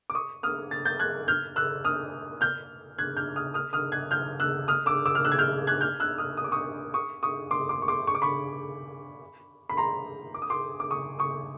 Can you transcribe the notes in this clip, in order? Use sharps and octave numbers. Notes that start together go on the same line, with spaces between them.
D6
C#6 D#6
D#6 F6
A6
G6 A6
F#6 G#6
F6 G6
E6 F#6
D#6 F6
F6 G6
F#6 G#6
F6 G6
D#6 F6
D#6 F6
D#6 F6
F#6 G#6
F6 G6
E6 F#6
D#6 F6
D6 E6
D6 E6
F6
E6 F#6
G#6
F6 G6
F#6 G#6
F6 G6
E6 F#6
D#6 F6
D#6
D6
C#6 D#6
C#6 D#6
C#6 D#6
C6 D6
C6 D6
C#6
C6 D6
C#6
D6
B5 C#6
B5
A#5 C6
D6
D#6
C6 D6
D6
C#6 D#6
C#6 D#6